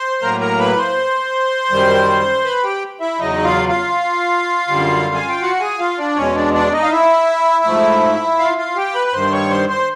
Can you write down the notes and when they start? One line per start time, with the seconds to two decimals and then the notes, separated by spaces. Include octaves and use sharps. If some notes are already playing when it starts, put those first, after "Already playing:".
Already playing: C5 C6
0.22 A2 F#3 A#3 A#4 A#5
0.40 A#4 A#5
0.59 B4 B5
0.77 C5 C6
1.71 F#2 D#3 G3
2.44 B4 B5
2.64 G4 G5
3.00 E4 E5
3.19 E2 C#3 F#3 D#4 D#5
3.43 F4 F5
3.69 F4 F5
4.68 F#2 D3 G3
5.15 G#5
5.29 G5
5.42 F#4 F#5
5.60 G#4 G#5
5.79 F4 F5
5.98 D4 D5
6.16 E2 B2 G#3 C#4 C#5
6.35 D4 D5
6.53 D4 D5
6.72 D#4 D#5
6.83 F5
6.91 E4 E5
7.65 G#2 F3 A3
8.39 F4 F5
8.58 F4 F5
8.76 G4 G5
8.95 B4 B5
9.07 B5
9.13 G2 D#3 G3 C5 C6
9.32 C#5 C#6
9.50 C5 C6
9.69 C5 C6